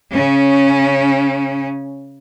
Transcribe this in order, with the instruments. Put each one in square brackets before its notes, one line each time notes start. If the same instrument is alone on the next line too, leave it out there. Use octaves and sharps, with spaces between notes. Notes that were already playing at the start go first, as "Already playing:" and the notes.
[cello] C#3 C#4